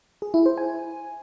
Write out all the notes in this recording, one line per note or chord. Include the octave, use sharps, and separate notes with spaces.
G#4
E4
C5
G#5